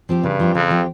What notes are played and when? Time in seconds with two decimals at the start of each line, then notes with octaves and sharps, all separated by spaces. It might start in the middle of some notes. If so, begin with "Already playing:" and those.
0.09 F3 C4 G4
0.23 G2 C#3
0.40 F3 C4 G4
0.54 F2 C#3
0.70 F3 C4 G4